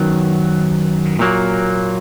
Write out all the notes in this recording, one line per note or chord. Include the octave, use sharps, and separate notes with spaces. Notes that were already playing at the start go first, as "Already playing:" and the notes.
Already playing: F#2 D#3 F#3 B3
A#2 F#3 A#3